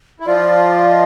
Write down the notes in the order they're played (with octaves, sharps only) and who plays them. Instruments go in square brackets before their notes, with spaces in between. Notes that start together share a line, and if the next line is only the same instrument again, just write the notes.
[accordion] E4
[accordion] F3 F4 [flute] D5
[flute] D#5